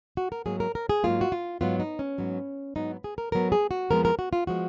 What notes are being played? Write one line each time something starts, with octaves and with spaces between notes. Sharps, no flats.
F#4
A#4
G#2 F#3 A#3 G#4
A#4
A#4
G#4
G#2 F#3 A#3 F4
F#4
F4
G#2 F#3 B3 F4
D#4
C#4
G#2 F#3 B3
G#2 F#3 B3 D#4
G#4
A#4
G#2 F#3 B3 A#4
G#4
F#4
F2 F3 G#3 B3 A#4
A#4
F#4
F4
F3 G#3 B3 F#4